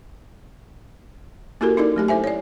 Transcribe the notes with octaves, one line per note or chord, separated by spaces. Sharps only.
A#3 E4 F#4 G4 A4 A#4
C#4 D#4 A4 A#4 D5
F#3 A3 G4
E4 A4 C5 E5 G#5
C#5 D5